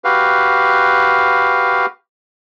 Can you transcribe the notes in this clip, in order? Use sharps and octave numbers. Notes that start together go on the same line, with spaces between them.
F#4 G4 B4 F5